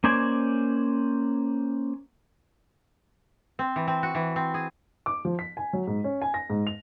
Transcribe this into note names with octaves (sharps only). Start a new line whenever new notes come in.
A#3 C#4 C5 D5 G#5
C4
E3
C4
F#4
E3
C4
G#4
D6
F3
B6
G#5
F#3
G#2
C#4
G#5
A#6
G#2
F7